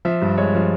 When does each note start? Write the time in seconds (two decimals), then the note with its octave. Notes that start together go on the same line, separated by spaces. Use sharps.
0.05 F3 E5
0.22 G2
0.38 G#3 C#5
0.55 F3